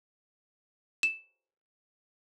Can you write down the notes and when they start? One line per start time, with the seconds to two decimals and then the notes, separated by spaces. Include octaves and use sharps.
1.03 E7